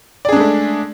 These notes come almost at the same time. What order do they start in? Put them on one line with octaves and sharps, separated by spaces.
D5 G#4 D4 G#3 A3